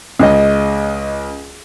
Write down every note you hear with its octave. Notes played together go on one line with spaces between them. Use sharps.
C#2 D#5